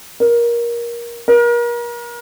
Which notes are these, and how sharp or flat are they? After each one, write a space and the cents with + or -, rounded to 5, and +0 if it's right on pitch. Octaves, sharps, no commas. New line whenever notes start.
A#4 +20
A#4 +35